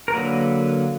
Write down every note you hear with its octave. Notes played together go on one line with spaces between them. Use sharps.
A#4
D3 F#3 A#3 B4